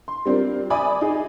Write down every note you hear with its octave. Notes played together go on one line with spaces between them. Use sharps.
C6
G3 C4 D4 F4 A#4
D5 E5 G#5 B5 D6 D#6
D#4 G#4